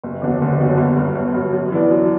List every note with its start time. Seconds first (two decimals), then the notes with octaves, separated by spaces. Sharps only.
0.04 F#1
0.22 E2 D3 F#3
0.42 F#1
0.60 E2 D3 F#3
0.78 G1
0.96 G2 F#3
1.15 G1
1.34 G2 F#3
1.53 F#2
1.72 E3 B3 D4
1.91 F#2